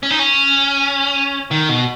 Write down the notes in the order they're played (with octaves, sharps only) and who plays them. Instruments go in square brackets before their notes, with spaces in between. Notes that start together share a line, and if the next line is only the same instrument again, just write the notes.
[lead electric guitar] C#4
D#4
C#4
D#3
B2